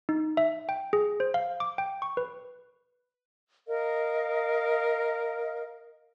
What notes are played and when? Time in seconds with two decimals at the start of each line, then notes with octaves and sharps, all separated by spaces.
0.09 D#4
0.37 E5
0.69 G5
0.93 G#4
1.20 C5
1.34 F5
1.60 D6
1.78 G5
2.02 C#6
2.17 B4
3.67 A#4 D#5 F5